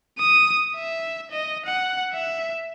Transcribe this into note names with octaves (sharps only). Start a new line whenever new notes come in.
D#6
E5
D#5
F#5
E5